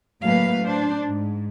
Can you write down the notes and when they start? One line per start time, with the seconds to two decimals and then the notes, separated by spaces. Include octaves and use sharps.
0.22 A2 F#3 A3 A#3 B4 F5
0.61 D4 C5
1.06 G#2